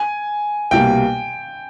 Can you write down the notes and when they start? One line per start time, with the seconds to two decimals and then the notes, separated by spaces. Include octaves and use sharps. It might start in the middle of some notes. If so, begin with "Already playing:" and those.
Already playing: G#5
0.71 C2 B2 G3 A#3 G5